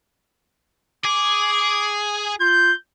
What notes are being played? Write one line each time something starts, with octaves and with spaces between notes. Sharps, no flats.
G#4 D6
F4 G6